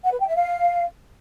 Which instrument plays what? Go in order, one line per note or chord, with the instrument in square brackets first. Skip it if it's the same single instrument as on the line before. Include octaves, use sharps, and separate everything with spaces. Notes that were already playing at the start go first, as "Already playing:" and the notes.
[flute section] F#5
B4
G5
E5
F5